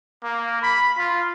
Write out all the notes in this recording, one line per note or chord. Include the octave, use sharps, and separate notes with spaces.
A#3
B5
F4